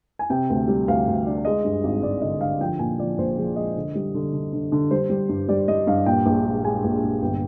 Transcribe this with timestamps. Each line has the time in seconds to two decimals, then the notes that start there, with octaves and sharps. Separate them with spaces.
0.19 G#5
0.30 C3 G5
0.50 D2
0.68 G3
0.88 D2 F5
1.07 D2
1.27 D4
1.45 G#3 D#5
1.64 G2
1.84 G#1
2.03 G#1 D5
2.22 D3 D#5
2.41 D3 F5
2.61 F3 G5
2.79 A#2 G#5
2.99 F3 D5
3.18 A#1 C5
3.37 F3 G#4
3.56 G#3 D#5
3.76 D3
3.95 G3
4.15 D3
4.33 D3
4.53 D3
4.72 D3
4.91 G3 C5
5.10 G3
5.29 G2
5.49 G3 D5
5.68 G3 D#5
5.87 G2 F5
6.06 A#2 G5
6.25 A#1
6.45 G#3
6.64 G#3 G#5
6.84 A#1
7.03 A#1
7.22 G1 G5